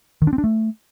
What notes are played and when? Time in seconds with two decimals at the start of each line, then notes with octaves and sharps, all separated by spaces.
0.22 D#3
0.27 D4
0.33 C4
0.38 D4
0.44 A3